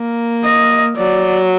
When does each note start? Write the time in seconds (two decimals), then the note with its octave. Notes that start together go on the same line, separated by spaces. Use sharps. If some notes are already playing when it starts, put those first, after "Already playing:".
Already playing: A#3
0.44 D#5
0.97 F#3 D5